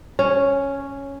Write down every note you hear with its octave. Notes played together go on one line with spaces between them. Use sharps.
C#4 C#5